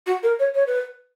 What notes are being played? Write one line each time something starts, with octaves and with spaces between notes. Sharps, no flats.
F#4
A#4
C#5
C#5
B4